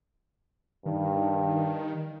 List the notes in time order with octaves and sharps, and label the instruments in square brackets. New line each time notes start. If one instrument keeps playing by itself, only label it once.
[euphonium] G2 [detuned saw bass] D#3